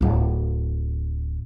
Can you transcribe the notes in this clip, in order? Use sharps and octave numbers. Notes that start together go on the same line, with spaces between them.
D1 F4